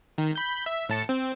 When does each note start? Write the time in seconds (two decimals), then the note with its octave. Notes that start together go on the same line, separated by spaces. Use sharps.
0.18 D#3
0.36 B5 G6
0.66 E5
0.89 A2 A5 C#7
1.09 C4